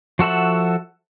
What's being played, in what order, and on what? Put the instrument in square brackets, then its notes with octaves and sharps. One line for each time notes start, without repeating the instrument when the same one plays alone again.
[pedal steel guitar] F3 F#4 A4 E5 F#5